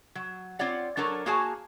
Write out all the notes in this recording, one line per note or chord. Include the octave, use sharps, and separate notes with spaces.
F#3
C4 F4 C#5 D5 F#5
F#3 D4 A4 A#4 C#5
A#3 F#4 G#4 C#5 G#5 A5